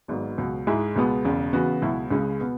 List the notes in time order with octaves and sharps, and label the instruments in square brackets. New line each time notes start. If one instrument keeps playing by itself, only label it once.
[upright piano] G#1 G#2 F#3 B3
C#2 B2 F#3
G#2 G#3 E4 G#4
C#2 B2 G#3 B3
E1 E2 C#3
C#3 E3 B3 F#4
C#2 B2 F#3 E4
C#2 C#3 G#3 C#4
B2 B3